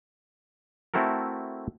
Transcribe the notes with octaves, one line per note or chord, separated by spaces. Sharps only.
A3 C4 E4 F#4 A4 A#4